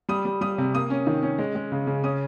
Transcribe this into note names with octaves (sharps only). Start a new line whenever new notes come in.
G3 D#6
G3
G3 D#6
C3
A#3 D#6
C#4
D#3
C#4
G#3
G#3
C#3
C#3
C#4 D#6